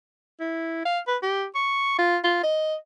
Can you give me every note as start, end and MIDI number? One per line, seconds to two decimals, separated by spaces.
0.40 0.82 64
0.86 1.00 77
1.08 1.17 71
1.23 1.46 67
1.55 1.98 85
1.99 2.18 65
2.24 2.42 65
2.43 2.76 75